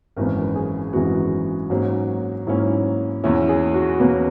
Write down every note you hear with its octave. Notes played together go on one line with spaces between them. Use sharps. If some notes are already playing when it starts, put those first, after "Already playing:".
G#1 F#2 E3 G#3 B3 A#4
G#4
G#1 F#2 E3 G#3 B3 F#4
G#2 F#3 A#3 C#4
G#2 F#3 A#3 C#4 E4
E2 B2 A#3 C#4 E4
G#4
F#4
E2 B2 A#3 C#4 B4